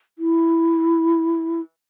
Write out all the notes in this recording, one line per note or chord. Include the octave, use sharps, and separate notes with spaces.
E4